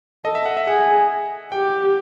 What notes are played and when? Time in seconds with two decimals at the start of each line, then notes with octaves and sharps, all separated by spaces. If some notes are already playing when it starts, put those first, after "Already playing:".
0.25 A4 D#5
0.35 E5
0.46 F#5
0.57 E5
0.67 G#4 F#5
1.52 G4 G5